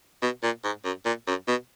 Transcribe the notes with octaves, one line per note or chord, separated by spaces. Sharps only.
B2
A#2
G#2
F#2
A#2
F#2
B2